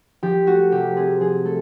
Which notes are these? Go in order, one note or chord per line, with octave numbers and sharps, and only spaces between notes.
F3 G4
A3 F#4
C3 G4
C4 G#4
F3 G#4
A3 A4